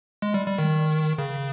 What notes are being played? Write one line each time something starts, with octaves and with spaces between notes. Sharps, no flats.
G#3
G3
G3
D#3
C#3